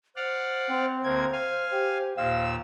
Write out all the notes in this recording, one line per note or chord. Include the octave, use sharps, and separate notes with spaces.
C5 D5 F5 F#5
C4
D2 A#3 G#6
F5 G#5
G4
D#2 A#2 F5 E6